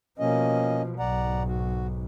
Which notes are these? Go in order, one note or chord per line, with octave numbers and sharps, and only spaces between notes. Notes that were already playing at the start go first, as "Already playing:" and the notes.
B2 F3 A#3 C#4 D#5
B1 G#2 D5 F#5 A#5
F#4